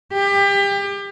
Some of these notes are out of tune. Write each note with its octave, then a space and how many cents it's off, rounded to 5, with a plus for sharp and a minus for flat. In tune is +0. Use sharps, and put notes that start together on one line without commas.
G4 +30